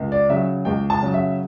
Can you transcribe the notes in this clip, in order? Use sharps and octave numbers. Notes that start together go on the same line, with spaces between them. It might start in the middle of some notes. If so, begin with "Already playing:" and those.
Already playing: C#2
D5
C#3 F#3 E5
C#2 G5
A5
C#3 F#3
E5